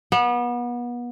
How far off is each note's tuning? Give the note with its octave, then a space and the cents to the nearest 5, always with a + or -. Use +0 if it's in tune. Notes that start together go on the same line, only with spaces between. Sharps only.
B3 -30